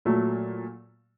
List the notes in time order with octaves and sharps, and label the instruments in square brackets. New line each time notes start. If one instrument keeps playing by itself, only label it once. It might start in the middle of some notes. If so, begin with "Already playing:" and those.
[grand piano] A#2 F#3 A3